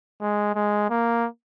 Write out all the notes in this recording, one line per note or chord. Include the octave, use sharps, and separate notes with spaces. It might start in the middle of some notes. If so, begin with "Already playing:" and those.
G#3
G#3
A#3